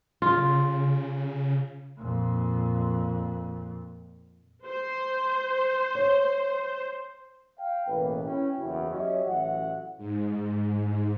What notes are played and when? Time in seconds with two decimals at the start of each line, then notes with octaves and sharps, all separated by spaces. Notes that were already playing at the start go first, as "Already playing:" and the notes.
0.22 C#3 F4
1.97 F2 A#2
4.65 C5
5.95 C#5
7.58 F5 G5
7.87 A1 B2 A#3 B4
8.24 C#4 E4 G5
8.57 F#1 E2 E4 F#4
8.90 F#3 C#4 G4 C#5 D#5 E5
9.25 A1 F#3 E5 F#5
9.98 G#2